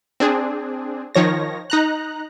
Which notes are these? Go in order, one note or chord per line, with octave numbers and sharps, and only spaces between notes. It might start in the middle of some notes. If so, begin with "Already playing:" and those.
C4 D4 G#4
D#3 F3 C#5 A#6
D#4 A#5 F#6